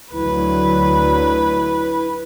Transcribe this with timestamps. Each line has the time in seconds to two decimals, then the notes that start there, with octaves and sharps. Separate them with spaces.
0.13 D2 F#3 E4 B4